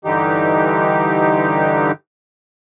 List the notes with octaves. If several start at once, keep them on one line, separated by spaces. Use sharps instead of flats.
G2 D3 E3 D#4 G4